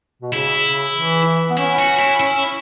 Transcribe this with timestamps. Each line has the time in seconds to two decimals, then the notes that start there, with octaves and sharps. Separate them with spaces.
0.22 B2
0.33 C#3 E4
0.64 C#3
0.96 E3
1.50 B3
1.58 C#4 E4
1.79 F#4
1.99 E4
2.20 E4